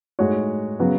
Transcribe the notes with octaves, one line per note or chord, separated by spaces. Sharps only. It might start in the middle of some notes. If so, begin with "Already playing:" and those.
A2 G#3 D#4 F#4 C#5
C#3 F#3 B3 F#4 B4